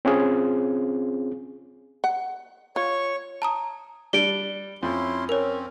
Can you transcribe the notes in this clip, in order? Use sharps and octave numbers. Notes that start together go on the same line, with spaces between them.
C4 C#4 F4 G#4
F#5
F4 C#5 C#6
A5 A#5 D#6
G3 D4 D7 G7
F2 C#4 E4 C6
C4 C#4 A#4 C#5